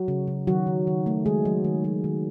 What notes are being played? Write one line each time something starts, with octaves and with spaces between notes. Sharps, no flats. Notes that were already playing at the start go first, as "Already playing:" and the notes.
Already playing: F#3 F#4
C#3
C#3
D#3 F#3 F#4
D#3
D#3
A3
D#3 G#3 G#4
F#3
D#3
F#3
D#3